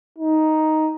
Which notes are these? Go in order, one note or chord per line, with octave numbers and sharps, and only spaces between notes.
D#4